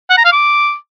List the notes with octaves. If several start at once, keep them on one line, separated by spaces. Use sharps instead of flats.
F#5
A#5
F5
D6